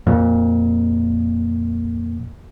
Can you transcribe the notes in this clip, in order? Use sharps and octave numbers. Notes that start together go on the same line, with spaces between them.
F2 A#2